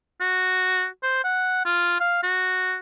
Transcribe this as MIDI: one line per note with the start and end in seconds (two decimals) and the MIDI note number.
0.21 0.86 66
1.03 1.23 72
1.24 1.63 78
1.65 1.99 65
2.00 2.19 77
2.23 2.77 66